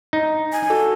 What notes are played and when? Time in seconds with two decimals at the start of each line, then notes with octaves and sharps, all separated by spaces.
0.13 D#4
0.53 G#5
0.70 F#4 A4